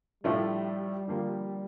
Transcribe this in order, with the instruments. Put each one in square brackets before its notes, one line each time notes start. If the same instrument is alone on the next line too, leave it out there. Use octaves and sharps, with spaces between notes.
[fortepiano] A2 F3 A3 D4 F4 [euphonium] G3
[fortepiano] D3 F3 A#3